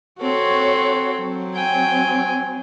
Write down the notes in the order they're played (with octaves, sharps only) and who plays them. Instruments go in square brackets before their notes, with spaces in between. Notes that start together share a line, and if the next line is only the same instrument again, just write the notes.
[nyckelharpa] C4 A4 [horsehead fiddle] F#4 C#5
[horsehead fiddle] F#3 C4
[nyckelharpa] G5 G#5